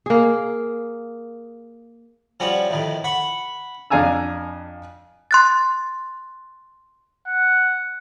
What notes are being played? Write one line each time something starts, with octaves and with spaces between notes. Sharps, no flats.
A#3 G#4
F3 G3 C#4 F#4 G4
F2 A2 D#3
F#5 B5 C#6
F2 D4 F5 G#5 A#5 E6
C6 F#6 A6
F#5